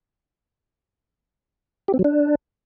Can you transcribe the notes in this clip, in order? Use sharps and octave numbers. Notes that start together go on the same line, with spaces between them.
G4
C4
F#3
D4